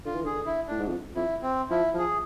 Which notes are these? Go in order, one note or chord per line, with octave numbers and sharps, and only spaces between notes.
D3 F4
E3
D3 G#4
E4
A2 D4
G#2
F2
F2 E4
C4
F3 E4
F3 G#4